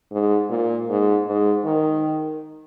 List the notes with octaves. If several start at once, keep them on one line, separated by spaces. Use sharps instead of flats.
G#2
A#2
G#2
G#2
D#3